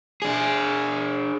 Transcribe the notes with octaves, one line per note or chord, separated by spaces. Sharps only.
D4 G#4